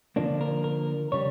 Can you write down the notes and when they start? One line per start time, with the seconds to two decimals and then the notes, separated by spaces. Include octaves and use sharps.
0.16 D3 F3 A#3 D4
0.41 A#4
0.64 A#4
1.12 C#3 G3 C#5